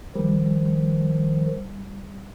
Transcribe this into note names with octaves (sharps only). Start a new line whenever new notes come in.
D#3 F3 G3